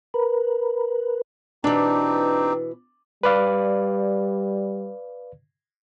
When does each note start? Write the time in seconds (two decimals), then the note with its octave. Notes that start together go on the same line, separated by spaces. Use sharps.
0.14 A#4 B4
1.64 B2 E3 C4 D4 D#4 G4
3.23 G3 B4 D5 F5